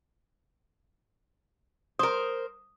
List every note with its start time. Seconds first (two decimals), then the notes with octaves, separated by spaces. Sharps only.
1.99 A#4 C5 D#6